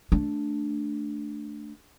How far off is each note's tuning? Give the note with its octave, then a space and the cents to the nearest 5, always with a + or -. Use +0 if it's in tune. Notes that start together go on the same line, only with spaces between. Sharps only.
A3 +0 D4 +0